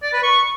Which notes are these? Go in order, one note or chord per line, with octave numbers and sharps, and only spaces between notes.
D5
B4
C#6